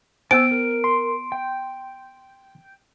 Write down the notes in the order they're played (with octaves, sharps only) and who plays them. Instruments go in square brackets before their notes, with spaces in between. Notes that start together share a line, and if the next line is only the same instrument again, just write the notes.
[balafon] B3 C5 [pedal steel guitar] G#5 E6 [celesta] D7
[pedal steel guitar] A#4
[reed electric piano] C6
[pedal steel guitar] G5